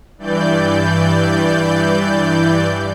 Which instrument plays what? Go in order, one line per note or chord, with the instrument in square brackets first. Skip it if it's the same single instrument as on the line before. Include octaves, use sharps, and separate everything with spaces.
[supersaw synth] G2 E3 D5 G6